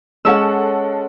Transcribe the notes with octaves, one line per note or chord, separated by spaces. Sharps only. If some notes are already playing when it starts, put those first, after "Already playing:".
G#3 C#4 A4 F#5 E6